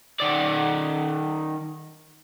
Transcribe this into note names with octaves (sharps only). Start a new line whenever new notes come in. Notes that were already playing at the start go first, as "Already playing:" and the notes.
D#3 D5